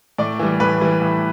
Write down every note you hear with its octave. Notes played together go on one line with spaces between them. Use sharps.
A2 D5
E3 G3
A2 B4
E3 G3
A2